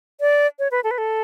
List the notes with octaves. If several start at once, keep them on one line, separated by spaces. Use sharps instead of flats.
D5
C#5
B4
A4
B4
A4